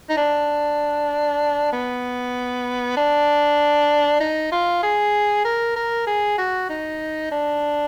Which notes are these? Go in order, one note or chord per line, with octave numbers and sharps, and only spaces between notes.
D#4
D4
B3
D4
D#4
F4
G#4
A#4
A#4
G#4
F#4
D#4
D4